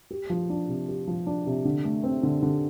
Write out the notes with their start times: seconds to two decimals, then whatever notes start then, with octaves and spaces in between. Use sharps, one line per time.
0.11 G4
0.30 F3
0.50 D4
0.68 C3
0.88 G4
1.07 F3
1.27 D4
1.46 C3
1.65 D3
1.85 A3
2.03 C4
2.23 D3
2.43 D3